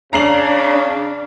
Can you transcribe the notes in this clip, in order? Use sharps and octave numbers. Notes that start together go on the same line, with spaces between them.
C#3 D4 A#5 C7 F#7